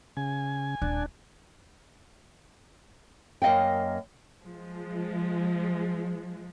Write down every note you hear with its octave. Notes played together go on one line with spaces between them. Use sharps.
C#3 G#5
D#1 D4
F#2 A#3 D#5 F5 G5
F3 G#3